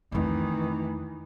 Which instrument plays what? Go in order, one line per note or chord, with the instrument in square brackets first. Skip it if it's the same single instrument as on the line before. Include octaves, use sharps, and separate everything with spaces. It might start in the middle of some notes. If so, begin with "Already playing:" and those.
[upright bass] F2 A3 [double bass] D#3 E3